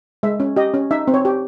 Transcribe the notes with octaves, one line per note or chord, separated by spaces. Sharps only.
G#3 E5
C#4
G4 D#5
C#4
D#4 E5
C4
C#5
G4